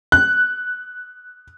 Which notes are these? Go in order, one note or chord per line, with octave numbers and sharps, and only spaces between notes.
F#6